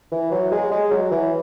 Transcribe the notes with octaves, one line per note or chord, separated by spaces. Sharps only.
E3
F#3
G#3
G#3
F#3
E3